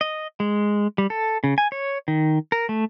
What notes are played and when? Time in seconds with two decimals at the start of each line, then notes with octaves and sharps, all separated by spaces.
0.01 D#5
0.40 G#3
0.98 G3
1.10 A4
1.44 C#3
1.58 G#5
1.72 C#5
2.08 D#3
2.52 A#4
2.69 A3